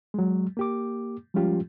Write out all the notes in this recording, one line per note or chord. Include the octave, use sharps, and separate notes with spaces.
F#3 G#3
A#3 G4 D6
F3 G3 G#3 C#4 F4 G4